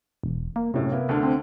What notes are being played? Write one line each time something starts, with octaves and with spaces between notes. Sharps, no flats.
E1
A#3
F#2 A2 C3
A#3 B3 E4
D2 D3
C4